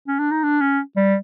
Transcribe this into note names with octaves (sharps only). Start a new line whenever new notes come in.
C#4
D4
D#4
D4
C#4
G3